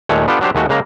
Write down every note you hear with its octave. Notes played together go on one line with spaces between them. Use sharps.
D#2 A#2 G#3 A3 C#5
B3 D4 F4 G4 A4
F#3 D4 G4 C5
D#2 G#3 A3 F#4
C#3 G#3 A#3 A#5